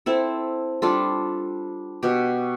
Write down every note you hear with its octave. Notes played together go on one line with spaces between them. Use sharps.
C4 E4 A4
G3 D4 F4 A4
B2 G4